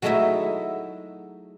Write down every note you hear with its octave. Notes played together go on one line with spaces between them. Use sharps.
F#3 G#3 A3 D#4 E4 E5